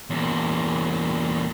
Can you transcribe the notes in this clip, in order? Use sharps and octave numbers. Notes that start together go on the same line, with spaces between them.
E2 A#2